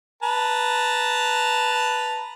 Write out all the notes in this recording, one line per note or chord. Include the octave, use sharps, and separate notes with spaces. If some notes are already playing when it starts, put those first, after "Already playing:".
B4 A5 A#5